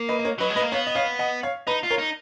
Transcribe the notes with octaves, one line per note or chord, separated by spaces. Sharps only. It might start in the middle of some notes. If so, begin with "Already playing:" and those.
Already playing: A#3
B4 D#5
D#5
A#4 C#5
F#3 B4 D#5
G#3
B4 D#5
A#3
B3 C#5 F5
D#5
C#5 F5
D#5 F#5
C#5 F5
D#4 B4 D#5
F4
A#4 C#5
D#4